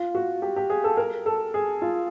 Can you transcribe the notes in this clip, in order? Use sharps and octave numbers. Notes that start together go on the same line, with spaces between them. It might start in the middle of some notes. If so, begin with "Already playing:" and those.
Already playing: F4
F#4
G4
G4
G#4
A4
A#4
A4
G#4
F4